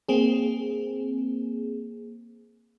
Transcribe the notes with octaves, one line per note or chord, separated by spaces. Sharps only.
A#3 C4 G#4